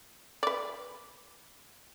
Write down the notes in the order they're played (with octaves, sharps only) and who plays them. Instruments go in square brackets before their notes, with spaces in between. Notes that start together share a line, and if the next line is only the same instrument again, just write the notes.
[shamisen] B4 D5